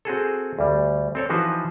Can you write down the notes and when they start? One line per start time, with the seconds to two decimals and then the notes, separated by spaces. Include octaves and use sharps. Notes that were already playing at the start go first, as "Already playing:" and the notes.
0.05 C4 F#4 G#4 A4
0.59 D2 G3
1.15 C4 A4 C#5
1.30 E3 F3 D#4 F#4 B4 C5